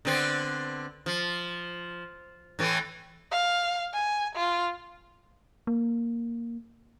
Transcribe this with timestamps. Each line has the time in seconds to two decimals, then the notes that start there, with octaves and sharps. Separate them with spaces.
0.05 D3 B3 C4
1.06 F3
2.59 A2 E3 A3
3.32 F5
3.93 G#5
4.35 F4
5.67 A#3